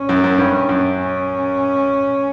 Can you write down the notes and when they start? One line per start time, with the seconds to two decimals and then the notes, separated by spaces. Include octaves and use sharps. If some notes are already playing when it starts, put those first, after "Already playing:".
Already playing: C#4
0.09 F#2
0.24 F#2
0.38 G2
0.69 F#2
0.99 C#4